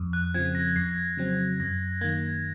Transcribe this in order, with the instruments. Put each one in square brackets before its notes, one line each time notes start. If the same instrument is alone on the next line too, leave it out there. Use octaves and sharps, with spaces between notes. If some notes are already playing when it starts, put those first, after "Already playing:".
Already playing: [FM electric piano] F2
[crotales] F#6
[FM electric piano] C#3 F3 C4 [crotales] G#6
[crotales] A#6
[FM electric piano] F2 [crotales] C7
[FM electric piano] C#3 F#3 C4
[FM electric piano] F#2 [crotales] A#6
[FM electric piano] D#3 A#3 [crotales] G#6